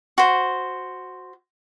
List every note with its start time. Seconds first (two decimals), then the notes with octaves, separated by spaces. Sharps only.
0.18 F#4 C5